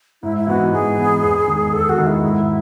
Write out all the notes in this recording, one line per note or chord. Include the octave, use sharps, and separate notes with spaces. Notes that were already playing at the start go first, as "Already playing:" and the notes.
G#2 E4
E4
E3 B3 D#4 F#4
G#2 G#4
E3 B3 D#4
E2
D#3 G#3
E2 A4
F#4
D#3 G#3
E4
G#2